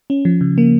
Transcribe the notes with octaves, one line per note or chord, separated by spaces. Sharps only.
C#4
F3
C#3
A#3